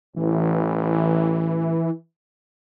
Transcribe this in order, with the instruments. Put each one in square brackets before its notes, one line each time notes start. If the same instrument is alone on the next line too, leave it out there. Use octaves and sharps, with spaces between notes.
[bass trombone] A1 [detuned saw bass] E3